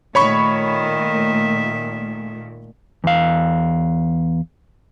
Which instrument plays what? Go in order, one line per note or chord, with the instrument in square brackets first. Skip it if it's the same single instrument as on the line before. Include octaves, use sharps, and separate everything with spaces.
[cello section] A#2 A3 [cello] D#3 E5 [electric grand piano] C#5 B5 C#6
[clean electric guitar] E2 F5